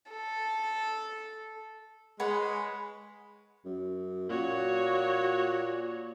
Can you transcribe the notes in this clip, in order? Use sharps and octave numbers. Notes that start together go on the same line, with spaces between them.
A4
G#3 B4 C#5 F#5
F#2
A#2 F#4 C#5